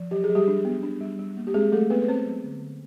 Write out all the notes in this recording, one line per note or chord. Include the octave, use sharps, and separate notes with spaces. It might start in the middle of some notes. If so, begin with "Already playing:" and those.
Already playing: F3
F#3 G4
G#4
F#3
G3 G4
D4
B3
D4
G3
G3
A#3
G4
G#3 C4 G#4
F#3 A3 A4
B3 C4 B4
B4
A3 C4 C5
F#3
D3
D3